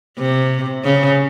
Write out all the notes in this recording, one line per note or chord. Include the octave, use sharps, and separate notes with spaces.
C3
C#3